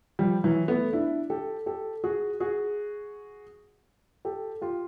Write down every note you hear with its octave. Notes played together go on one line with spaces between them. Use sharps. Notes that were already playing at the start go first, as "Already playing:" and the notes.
F3 G3
E3 F#3
A3 B3
D4 E4
G4 A4
G4 A4
F#4 G#4
F#4 G#4
G4 A4
F4 G4